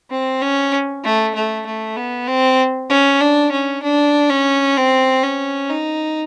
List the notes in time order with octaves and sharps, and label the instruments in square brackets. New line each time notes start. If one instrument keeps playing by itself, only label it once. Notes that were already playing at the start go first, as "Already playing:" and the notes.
[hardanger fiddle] C4
C#4
A3
A3
A3
B3
C4
C#4
D4
C#4
D4
C#4
C4
C#4
D#4